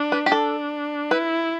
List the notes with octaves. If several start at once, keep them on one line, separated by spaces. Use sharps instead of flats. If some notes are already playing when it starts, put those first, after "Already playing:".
Already playing: D4
B4
G4
D4 A4
E4 B4